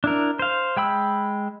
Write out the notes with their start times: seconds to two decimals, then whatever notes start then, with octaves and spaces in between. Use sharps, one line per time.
0.04 D4 E4 A#4
0.39 C5 F5
0.77 G#3 G5 B5 E6